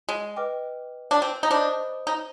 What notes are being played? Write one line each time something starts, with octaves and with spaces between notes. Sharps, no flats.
G#3
B4 D#5 G5 D6 F6
D4
C4
D#4
D4 C5 D#5 B5 D#6 G6
D#4